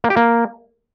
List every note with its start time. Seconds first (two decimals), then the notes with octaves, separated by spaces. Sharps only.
0.04 A#3
0.10 G4
0.16 A#3